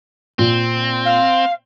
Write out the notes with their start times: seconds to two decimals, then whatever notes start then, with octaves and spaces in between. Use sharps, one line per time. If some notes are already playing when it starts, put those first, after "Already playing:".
0.39 A#2 C4
1.05 F5